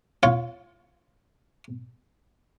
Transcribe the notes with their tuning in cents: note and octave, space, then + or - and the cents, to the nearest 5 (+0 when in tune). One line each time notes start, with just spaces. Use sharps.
F4 -20 C#5 +0 F5 +30